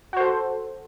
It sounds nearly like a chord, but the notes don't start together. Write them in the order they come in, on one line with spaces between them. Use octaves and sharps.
F#4 C5 A4